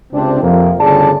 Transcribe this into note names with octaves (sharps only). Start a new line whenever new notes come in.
C#2 C3 C4 D4
F2 C3 F3 A#3
G1 D2 C#3 G#4 D5 A5